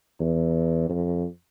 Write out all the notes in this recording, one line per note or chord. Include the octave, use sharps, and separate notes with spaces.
E2
F2